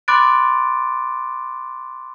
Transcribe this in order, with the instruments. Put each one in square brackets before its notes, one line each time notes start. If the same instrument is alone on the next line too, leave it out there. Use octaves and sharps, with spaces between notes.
[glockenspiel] B5 C6 D6 F#6 A6 D7